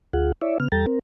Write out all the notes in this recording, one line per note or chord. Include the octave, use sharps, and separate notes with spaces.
D2 F4 G#4 F#5
E4 C#5 D5 E5
C#3 B3 F6
E2 G3 A4 G5 A#5 A6
C4 A#4